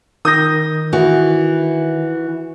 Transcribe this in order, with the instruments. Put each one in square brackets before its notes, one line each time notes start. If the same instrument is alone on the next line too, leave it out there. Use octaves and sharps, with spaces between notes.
[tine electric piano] D#3 [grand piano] D#6 G6 A#6
[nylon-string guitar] E3 [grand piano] F#4